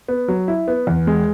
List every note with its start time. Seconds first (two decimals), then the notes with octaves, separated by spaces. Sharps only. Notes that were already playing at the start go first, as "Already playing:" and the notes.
0.08 B3
0.28 F#3
0.48 E4
0.68 B3
0.87 E2
1.07 G#3